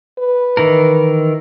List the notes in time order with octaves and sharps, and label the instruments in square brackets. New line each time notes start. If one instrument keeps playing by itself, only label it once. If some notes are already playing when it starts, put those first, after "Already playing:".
[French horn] B4
[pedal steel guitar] D#3 E3 A#4